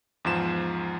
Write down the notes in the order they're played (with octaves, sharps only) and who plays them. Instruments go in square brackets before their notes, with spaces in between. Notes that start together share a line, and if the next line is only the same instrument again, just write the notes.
[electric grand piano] E2 G#2 F3 E7